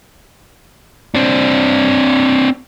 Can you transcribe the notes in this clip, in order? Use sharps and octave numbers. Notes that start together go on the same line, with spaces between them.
C4 D4